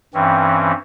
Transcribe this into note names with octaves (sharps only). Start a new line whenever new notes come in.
G2 E3 C4 C#4